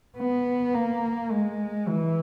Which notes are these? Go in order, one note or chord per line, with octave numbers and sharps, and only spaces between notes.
B3
A#3
G#3
E3